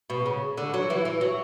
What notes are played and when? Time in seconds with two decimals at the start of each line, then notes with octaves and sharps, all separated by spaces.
0.10 B2
0.26 C#3
0.57 D3
0.74 F#3
0.90 E3
1.05 E3
1.21 F#3